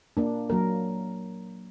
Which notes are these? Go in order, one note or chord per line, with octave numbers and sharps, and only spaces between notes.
A#3 D4
F#3 A#3 A#4